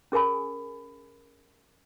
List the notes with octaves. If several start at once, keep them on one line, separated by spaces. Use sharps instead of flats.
C#4 G#4 A#4 G#5 B5